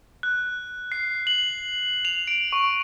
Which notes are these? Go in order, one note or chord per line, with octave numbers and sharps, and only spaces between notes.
F#6
C7
F#7
F7
D7
C#6